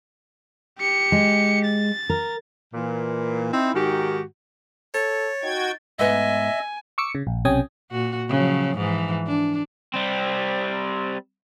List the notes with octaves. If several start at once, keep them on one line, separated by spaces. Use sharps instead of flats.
G4 C#7
G#3
A6
A#4
A#2 E3
C4 D#4 E4
G#2 D#3 F#4 G4
A4 C#5 A6
D#4 F#4 G5 G#6
G#2 B3 D#5 E5 G#5
C#6 D6 E6 C#7
C#3
A#1
B1 C3 C#4 G5 G#5 D#6
A#2 F#4
C#3 F3 F#3
G#2 E3 F3
D4
G3 C4